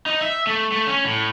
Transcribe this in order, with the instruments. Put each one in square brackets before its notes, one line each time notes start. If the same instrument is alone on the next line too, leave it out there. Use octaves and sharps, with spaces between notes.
[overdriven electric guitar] D#4
E5
A3
A3
C#4
A2